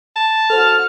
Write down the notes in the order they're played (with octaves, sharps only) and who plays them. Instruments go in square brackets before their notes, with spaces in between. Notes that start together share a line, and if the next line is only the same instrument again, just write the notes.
[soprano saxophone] A5
[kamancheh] F#4 F6 [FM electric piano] A4 C5